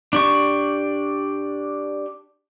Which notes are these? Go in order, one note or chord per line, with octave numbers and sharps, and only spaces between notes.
D4 G4 C#6